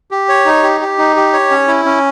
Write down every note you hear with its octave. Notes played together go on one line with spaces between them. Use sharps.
G4
C#5
D#4
G4
G4
D#4
G4
C#5
C#4
E4
C#4